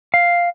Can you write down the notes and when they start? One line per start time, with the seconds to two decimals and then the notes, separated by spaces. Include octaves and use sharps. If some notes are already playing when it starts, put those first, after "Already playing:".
0.14 F5